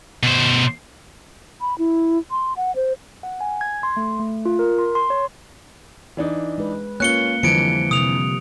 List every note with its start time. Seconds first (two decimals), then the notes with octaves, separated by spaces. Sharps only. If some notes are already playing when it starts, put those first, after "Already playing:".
0.23 B2 C5
1.61 B5
1.78 E4
2.31 C6
2.57 F#5
2.76 C5
3.23 F#5
3.41 G#5
3.61 G#6
3.83 C6
3.97 A3
4.19 A3
4.46 F4
4.59 A#4
4.79 C6
4.95 C6
5.10 C#5
6.17 E3 D4 D#4
6.58 G#3 B4
7.00 A#3 C#4 F4 F#6 C#7 G7
7.43 F2 D3 E3 F3 G3 C#7 D7
7.91 C3 D#6 F7